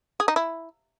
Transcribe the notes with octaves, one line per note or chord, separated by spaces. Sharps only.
G#4
D#4
E4